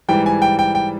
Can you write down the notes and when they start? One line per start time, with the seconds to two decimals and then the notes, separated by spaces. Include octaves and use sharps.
0.09 G#2 E3 G3 G5
0.26 G#5
0.42 G5
0.59 G5
0.75 G5